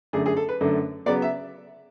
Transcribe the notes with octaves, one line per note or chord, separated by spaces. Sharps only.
F#2 D3 A3 G#4
G#4
A4
B4
F#2 D3 A3
C#3 F#3 B3 D5
E5